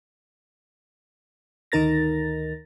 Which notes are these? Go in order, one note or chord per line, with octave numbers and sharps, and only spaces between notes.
D2 D#3 D#4 A#4 A6 A#6